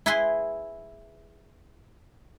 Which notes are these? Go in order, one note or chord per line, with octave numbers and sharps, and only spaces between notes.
E4 G#4 B4 G#5 C6